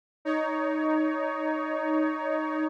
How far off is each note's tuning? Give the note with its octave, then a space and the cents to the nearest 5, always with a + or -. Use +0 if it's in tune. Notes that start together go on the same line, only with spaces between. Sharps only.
D#4 +0 C#5 +20